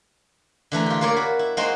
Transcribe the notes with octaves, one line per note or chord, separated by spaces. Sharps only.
D3 E3 A3 A#5
F4 G4
A#3 F4 A#4 C#5 D5
F#4 B5
E4
G#3 A#3 D#4 F#4 C5 G5